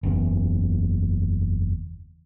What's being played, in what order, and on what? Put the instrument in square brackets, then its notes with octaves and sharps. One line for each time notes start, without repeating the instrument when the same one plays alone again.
[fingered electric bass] F#1 E2